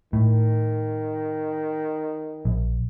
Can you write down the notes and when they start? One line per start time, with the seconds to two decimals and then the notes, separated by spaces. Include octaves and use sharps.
0.13 A2 D#3
2.45 A#1